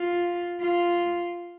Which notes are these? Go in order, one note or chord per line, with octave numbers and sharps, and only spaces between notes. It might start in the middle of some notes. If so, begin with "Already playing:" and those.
Already playing: F4
F4